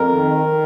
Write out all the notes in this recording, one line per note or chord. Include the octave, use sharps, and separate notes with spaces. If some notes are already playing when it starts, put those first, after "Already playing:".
Already playing: F2 A#4
D#3
D#3